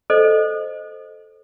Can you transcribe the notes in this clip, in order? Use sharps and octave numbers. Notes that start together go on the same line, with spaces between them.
A4 C5 D#5